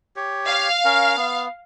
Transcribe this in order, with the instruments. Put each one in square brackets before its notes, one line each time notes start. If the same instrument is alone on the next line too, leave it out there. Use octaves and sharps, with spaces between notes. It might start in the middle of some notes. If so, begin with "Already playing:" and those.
[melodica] G4 C#5
[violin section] F5
[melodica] C#4 A#4
B3